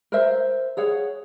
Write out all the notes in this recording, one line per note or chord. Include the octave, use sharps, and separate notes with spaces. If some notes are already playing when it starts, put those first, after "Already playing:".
A#4 C5 E5
G#4 C#5 F#5